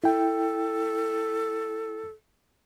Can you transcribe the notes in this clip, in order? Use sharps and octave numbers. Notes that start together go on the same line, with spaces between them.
E4 A4 G5